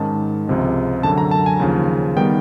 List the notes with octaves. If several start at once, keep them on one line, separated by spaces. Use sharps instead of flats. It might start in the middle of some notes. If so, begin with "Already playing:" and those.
Already playing: G#2 D#3 G#3 C#4 A5
C#2 C3 F3 G#3
F#2 D3 F#3 A5
A#5
A5
G#5
D#2 C#3 F3
D#3 G3 B3 G5